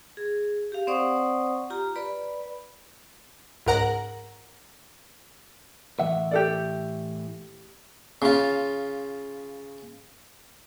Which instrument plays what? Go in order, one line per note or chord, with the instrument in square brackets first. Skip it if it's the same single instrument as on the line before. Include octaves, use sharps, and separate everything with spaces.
[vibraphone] G#4
G4 F5
C4 C5 D5 F#5 C#6 D#6
F4 G4 A#5
B4 D5 B5
[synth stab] C#2 G#2 A#4 F#5 A#5
[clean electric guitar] A2 E3 E5 [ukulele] F#5
[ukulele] G4 A4 D5
[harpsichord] C#3 F4